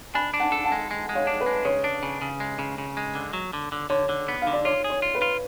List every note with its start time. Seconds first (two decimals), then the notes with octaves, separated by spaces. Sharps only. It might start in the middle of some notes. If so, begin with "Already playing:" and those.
0.14 D4 G#5 B5
0.34 D4
0.40 F#5 A5
0.52 A4
0.64 F#5 A5
0.72 G#3
0.91 G#3
1.09 G#3
1.15 C#5 F5
1.27 D4
1.41 B4
1.46 G#3
1.65 C#3 C#5
1.84 D4
2.03 C#3
2.22 C#3
2.40 G#3
2.59 C#3
2.78 C#3
2.97 G#3
3.15 D3
3.33 F#3
3.53 D3
3.72 D3
3.90 D3 C#5
4.09 D3
4.28 B3
4.42 F5
4.47 D3
4.53 D5
4.65 F4 C#5
4.84 G#4
4.90 C#5
5.02 F4
5.15 B4
5.22 F4